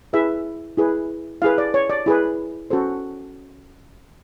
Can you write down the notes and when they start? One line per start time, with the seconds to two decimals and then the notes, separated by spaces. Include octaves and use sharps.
0.13 E4 G#4 B4 E5
0.77 E4 G#4 B4
1.42 E4 G#4 B4 F5
1.58 D5
1.74 C#5
1.89 D5
2.06 E4 G#4 B4
2.70 C#4 F#4 A4 C5